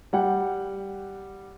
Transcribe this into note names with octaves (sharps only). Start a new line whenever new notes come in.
G3 F#5 G5